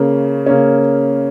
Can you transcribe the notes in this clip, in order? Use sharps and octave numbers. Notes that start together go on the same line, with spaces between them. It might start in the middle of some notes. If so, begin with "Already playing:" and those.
Already playing: C#3 A#3 C#4
C#3 A#3 C#4